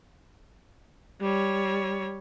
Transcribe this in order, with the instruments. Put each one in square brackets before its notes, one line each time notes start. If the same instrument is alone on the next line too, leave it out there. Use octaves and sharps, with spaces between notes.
[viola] G3 C#5